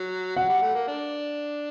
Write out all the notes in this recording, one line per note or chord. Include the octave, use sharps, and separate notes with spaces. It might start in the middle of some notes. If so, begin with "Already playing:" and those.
Already playing: F#3
F#3 F#5
G3
A3
A#3
D4